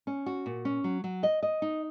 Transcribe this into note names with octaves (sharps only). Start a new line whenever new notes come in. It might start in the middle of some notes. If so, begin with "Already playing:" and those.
C#4
F#4
A#2
C#4
F#3
F#3
D#5
D#5
D#4